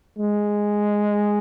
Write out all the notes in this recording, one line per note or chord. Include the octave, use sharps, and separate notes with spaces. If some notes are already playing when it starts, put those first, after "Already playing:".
G#3